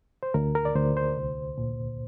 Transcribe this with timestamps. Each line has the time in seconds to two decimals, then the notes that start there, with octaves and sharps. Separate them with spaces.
0.23 C5
0.34 D2 A#4
0.55 A#4
0.65 D5
0.76 D2 C5
0.97 C5
1.16 C2
1.58 A#2